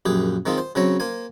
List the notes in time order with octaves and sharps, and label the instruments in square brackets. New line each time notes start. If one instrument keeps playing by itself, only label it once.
[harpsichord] A#1 F#2 G4 G#4
D#3 G#3 C4 D#4 F4
C5
C#3 F#3 C4 C#5 A#5
A#3 C5 G#5